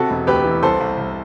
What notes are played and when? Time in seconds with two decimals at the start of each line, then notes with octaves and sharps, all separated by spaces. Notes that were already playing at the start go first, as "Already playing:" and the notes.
Already playing: C3 F#4 A4
0.10 E1
0.27 D2 G4 B4
0.44 E3
0.63 C2 A4 C5
0.80 C2
0.98 C2